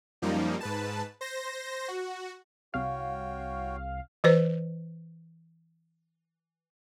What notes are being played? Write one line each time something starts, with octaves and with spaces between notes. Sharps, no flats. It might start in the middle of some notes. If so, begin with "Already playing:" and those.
F#2 F3 G3 A#3 D#4
G#2 B4 A5
C5 A#6
F#4
C2 F#4 C#5 F5 G5
E3 B4 C5